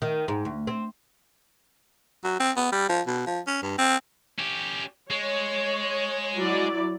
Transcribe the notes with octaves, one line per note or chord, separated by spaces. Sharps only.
D#3
G#2
D2
C4
F#3
C4
B3
G3
F3
B2
F3
C#4
G2
C4
C#4 G4
G#3 C#5
F#3 E4 D5